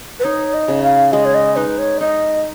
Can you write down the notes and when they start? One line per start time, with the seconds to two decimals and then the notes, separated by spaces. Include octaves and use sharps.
0.20 B4
0.24 D#4 C#5
0.54 D#5
0.68 C#3
0.83 F5
1.13 G#3 D#5
1.25 C#5
1.34 D#5
1.56 D#4 B4
1.78 C#5
2.00 D#4 D#5